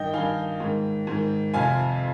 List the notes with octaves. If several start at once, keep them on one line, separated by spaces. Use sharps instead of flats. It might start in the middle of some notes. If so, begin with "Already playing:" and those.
Already playing: G2 D#3 D#5 G5
G2 D#3 F5 G#5
G#2 D#3
G#2 D#3
F2 C3 F3 F5 G#5